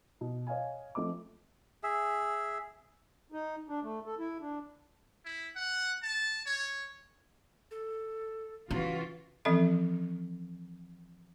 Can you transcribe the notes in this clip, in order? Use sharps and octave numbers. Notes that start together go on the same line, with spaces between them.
B2
C#5 D#5 F5 G#5
F3 A3 C4 D#5 D6
G#4 E5
D#4
D4
A3
A4
E4
D4
E4
F#5
A5
C#5
A4
C#3 E3 F4 F#4
E3 F3 C4 C#4 A4 E5